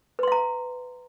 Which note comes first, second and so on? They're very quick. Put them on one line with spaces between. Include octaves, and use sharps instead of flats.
B4 C6 F5 A#5